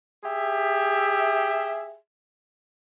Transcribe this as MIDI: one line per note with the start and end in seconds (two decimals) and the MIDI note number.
0.24 1.94 67
0.24 1.94 68
0.24 1.94 76